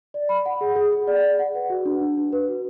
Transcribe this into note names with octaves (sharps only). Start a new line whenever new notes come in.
D5
B5
F#5
G#4
G#4
G#4
D5
G#4
F#5
B4
F#4
D4
D4
D4
B4
F#4